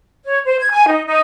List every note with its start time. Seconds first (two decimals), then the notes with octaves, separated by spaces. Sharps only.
0.25 C#5
0.45 C5
0.60 G#6
0.72 G#5
0.87 D#4
1.06 D#4